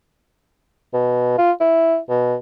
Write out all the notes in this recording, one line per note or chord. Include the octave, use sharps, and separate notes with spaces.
B2
F4
E4
B2